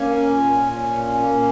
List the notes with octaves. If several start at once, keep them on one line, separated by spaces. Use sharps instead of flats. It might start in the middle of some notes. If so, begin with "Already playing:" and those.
Already playing: A#3 C#4 G#5
A#2
C#4
A#3